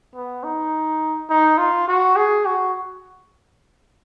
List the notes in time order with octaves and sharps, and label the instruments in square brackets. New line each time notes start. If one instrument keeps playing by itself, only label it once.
[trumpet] B3
D#4
D#4
F4
F#4
G#4
F#4